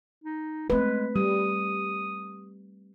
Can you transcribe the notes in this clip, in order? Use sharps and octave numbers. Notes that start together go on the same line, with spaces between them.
D#4
G#3 A3 C4 B4
G3 D#6